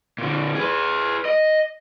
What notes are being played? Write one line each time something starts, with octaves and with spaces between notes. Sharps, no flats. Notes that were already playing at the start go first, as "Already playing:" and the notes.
A#2 D3
G#4 B4
D#5